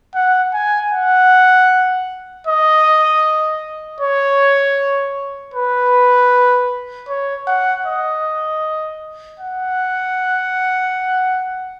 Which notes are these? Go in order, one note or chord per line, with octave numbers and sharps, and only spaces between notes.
F#5
G#5
F#5
D#5
C#5
B4
C#5
F#5
D#5
F#5